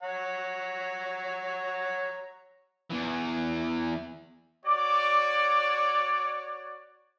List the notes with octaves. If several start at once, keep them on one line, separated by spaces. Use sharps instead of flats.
C#5 F#5 A#5
E2 E3
F#4 C#5 D5 D6